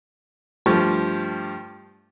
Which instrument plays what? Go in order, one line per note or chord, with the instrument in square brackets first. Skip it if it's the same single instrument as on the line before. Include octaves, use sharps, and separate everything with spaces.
[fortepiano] G2 F3 A3 G4 C#6